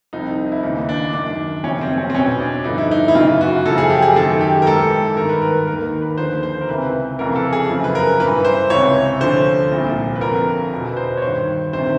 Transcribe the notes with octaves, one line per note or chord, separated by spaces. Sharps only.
C2 C3 F3 D#4
E4
D#2 C#3 E3 D#4
D4
F#2 D#3 D4
F#2 C#3 F3 C#4
C4
C4
C#4
C4
E2 B2 C#4
D4
G2 D3 F3 D#4
E4
D#4
E4
F#2 C#3 E3 F4
F#4
F#2 C#3 F3 A4
G#4
G4
G#4
F#2 D#3 A4
G4
A#4
G#2 E3 A4
G2 D#3 A#4
B4
A#4
D#2 D#3 A#4
B4
D#2 D3 F3 C5
C5
A#4
C#2 C3 E3 B4
F2 C#3 E3 A#4
A4
G#4
F#2 C#3 F3
B4
A#4
G2 E3 B4
C5
C#2 C3 E3 C#5
D2 D3 F3 C5
C2 A#2 F3
B4
F2 D3 F3 A#4
E2 B2
B4
C5
C#5
G2 D#3 C5
D2 C3 D#3 C5